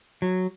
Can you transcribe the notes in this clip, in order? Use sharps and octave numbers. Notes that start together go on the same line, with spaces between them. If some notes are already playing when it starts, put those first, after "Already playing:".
F#3